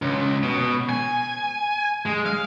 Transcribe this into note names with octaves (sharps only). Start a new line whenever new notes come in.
C#2
B2
G#5
G#3
F5